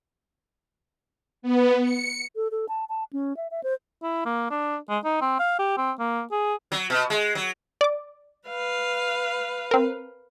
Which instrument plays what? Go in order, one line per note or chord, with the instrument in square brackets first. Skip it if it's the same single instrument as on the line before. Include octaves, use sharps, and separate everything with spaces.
[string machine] B3
C#7
[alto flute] A4
A4
A5
A5
C#4
E5
E5
C5
[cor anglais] E4
A#3
D4
G#3
D#4
C4
F5
G4
C4
A#3
G#4
[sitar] F#3
B2
G#3
F#3
[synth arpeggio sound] D5 D6
[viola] B4 F5
[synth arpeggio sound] C4 A#4